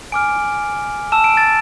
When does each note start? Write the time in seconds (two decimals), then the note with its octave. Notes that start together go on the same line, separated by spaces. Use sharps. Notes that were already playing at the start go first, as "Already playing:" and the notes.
0.12 G#5 D6 F6 D7
1.12 A5 E6 E7
1.24 D7
1.37 A6